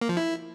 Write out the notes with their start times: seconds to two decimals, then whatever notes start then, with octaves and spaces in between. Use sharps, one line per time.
0.01 A#3
0.09 F3
0.17 E4